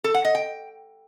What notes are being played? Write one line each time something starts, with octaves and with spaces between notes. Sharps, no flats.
A4
F#5
D#5
G5